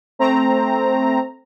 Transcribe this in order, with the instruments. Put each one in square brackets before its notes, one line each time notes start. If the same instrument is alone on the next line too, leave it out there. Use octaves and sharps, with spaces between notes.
[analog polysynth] A3 C4 A#5